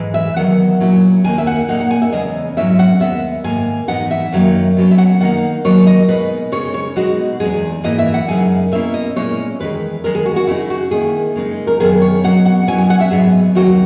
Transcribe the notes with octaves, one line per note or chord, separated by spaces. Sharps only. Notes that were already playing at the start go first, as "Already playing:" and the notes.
Already playing: G#2 E3 G#3
E5
E2 D#3 F#3 F#5
A#2 F#3 C#4 E4
D#2 D#3 A#3 G#5
E5
F#5
A#2 F#3 A#3 D#4 F#5
F#5
G#5
E5
E2 C#3 G#3 D#5
G#2 F#3 C#4 E4 E5
F#5
D#2 C#3 G#3 B3 E5
G#2 D#3 A#3 G#5
G#2 E3 B3 D#4 F#5
E5
F#2 D#3 F#3 A#3 D#4
B2 F#3 C#4
E5
F#5
D#3 A#3 D#4 F#5
D#3 F#3 A#3 D#4 C#5
D#5
B2 G#3 D#4 B4
C#3 G#3 D#4 C#5
C#5
B2 G#3 D#4 F#4
E2 B2 G#3 D#4 G#4
G#2 E3 A#3 E4 D#5
E5
F#5
F#2 C#3 G#3 D#4 G#5
B2 A#3 C#4 E4 E5
D#5
A#2 G#3 C#4 E4 C#5
E2 D#3 G#3 B4
E2 D#3 G#3 D#4 A#4
G#4
F#4
F#4
C#3 G#3 D#4 E4
F#4
D#3 A#3 E4 G#4
C#3 G#3 D#4
A#4
F#2 D#3 G#3 B3 G#4
C#5
B2 F#3 C#4 F#5
F#5
B2 F#3 C#4 E4 G#5
G#5
F#5
E5
G#2 F#3 B3 D#4 G#4
D#2 C#3 F#3 A#3 D#4 F#4